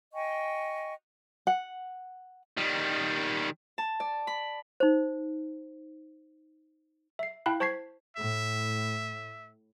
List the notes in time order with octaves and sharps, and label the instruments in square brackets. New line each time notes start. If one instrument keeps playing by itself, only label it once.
[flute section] D#5 G5 G#5 C#6
[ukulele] F#5
[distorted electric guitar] D#3 G3
[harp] A5
D5
B5
[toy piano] D#4 C5
[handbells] E5 C7
E4 F5 G5 A5 B5 F#6
C5 A5 C#6 G#6 B6 C7
[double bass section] A2 [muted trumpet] E5